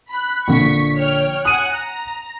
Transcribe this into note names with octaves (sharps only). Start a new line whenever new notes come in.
B5 F#6
A#1 D3 C#6 B6
C#5 G5 F6
F#5 G#5 D#6 F#6 D#7
A#5